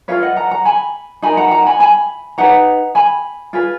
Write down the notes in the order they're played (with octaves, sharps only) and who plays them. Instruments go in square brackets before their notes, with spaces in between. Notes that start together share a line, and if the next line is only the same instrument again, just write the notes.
[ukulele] F4 G#4 B4 C#5 F5
D#5 F#5
F#5 A#5
F#5 A#5
G#5 B5
D#4 A#4 G#5 B5
F#5 A#5
F#5 A#5
G#5 B5
G#5 B5
D#4 G#4 B4 F#5 A#5
G#5 B5
F4 G#4 B4